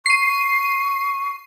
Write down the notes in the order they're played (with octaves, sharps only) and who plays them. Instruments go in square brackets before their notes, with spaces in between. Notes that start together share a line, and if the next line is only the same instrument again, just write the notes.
[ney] C#6 [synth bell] C7 D#7